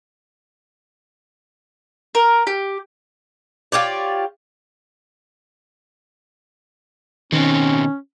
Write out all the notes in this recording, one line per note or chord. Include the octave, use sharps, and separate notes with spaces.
A#4
G4
F4 G4 C#5 D5
B2 D#3 C4 C#4